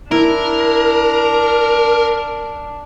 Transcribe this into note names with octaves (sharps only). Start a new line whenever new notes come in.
D4 E4 A#4